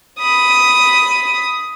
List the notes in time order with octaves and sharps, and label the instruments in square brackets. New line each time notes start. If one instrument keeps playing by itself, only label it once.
[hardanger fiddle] B5 D#6